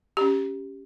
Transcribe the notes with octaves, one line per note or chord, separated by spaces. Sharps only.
C#4 G4